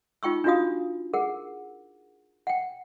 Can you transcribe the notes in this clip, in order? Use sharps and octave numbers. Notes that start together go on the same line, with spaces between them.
D#4 F4 G5 C#6 E6
D4 D#4 F4 F#4 F5 D#6
G#4 A#4 F#5
F#5 G5